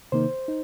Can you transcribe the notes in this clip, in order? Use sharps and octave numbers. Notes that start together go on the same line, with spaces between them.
C3 D#3 A#3 D#4 C5
D#4